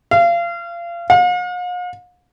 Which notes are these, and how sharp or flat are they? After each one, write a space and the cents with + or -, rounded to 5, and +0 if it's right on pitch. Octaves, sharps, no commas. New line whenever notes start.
F5 -30
F5 +45